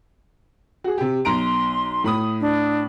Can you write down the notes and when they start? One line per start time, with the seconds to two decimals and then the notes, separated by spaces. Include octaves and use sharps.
0.84 F#4 G#4
0.98 C3 G4
1.25 B1 A#5 C6 D7
2.04 A2 B5 D#6
2.40 D4